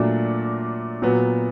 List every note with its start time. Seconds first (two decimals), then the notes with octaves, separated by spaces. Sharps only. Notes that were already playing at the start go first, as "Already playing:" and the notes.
Already playing: A#2 F#3 A3 D4
1.02 A#2 F#3 B3